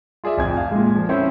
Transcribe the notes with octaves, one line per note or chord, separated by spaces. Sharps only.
F4 G#4 D5 E5
D1 F2 G#5 G#6
F5
A#2 G#3
F3
C4 C#4 E4 C5